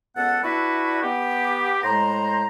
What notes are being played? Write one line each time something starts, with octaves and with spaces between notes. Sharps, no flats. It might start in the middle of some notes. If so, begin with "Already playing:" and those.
C#2 B3 A4 F#5
D4 E4 F#4 B4 E5
B3 G4
A2 G#3 C5 A#5